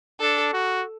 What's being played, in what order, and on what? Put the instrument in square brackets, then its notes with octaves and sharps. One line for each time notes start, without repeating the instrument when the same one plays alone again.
[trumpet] D4 [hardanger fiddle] A4
[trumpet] F#4